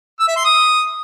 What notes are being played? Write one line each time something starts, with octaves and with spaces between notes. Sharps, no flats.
E6
E5
C6
D#6